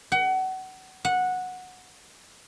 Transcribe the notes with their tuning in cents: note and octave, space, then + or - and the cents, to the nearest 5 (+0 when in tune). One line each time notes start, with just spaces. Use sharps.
F#5 +30
F#5 -10